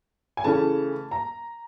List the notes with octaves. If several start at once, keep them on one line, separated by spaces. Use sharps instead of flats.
G#5
C#3 E3 A3 C#4 A5
A#5